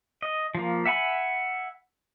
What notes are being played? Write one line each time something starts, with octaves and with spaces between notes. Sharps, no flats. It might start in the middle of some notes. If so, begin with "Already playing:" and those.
D#5
F3 A#3
E5 F#5 G#5 B5